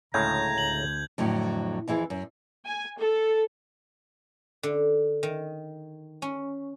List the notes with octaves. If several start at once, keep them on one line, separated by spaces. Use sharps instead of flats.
D2 A2 C#3 G#3 A#5 G6 G#6
D2 F#7
F2 A2 D3 F#3
F2 E3 E4 G#4
F#2
G#5
A4
D3
D#3
C#4